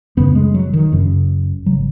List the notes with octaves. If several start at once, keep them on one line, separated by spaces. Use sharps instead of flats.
F#1 F#2 C#3 B3
G#3
F#3
D#3
F#1 F#2 C#3
G#1 C#3 F#3